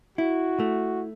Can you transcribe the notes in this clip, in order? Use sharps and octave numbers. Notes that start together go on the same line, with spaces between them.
E4 F#4
A3